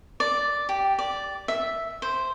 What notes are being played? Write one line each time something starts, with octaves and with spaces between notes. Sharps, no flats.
D5
G4
D5
E5
C5